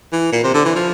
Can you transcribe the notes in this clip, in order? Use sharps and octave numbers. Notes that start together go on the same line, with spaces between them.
E3
A#2
C3
D3
E3
F3